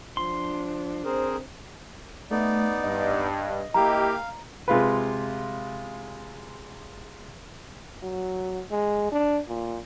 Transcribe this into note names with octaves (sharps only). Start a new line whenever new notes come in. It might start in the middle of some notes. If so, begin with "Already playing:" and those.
F3 D4 C6
C4 G#4 A#4 C5
A3 B3 D#4 D5
G2 D#5
A#3 E4 G4 F5 A#5
C3 G#3 F4 B4
F#3
G#3
D4
A#2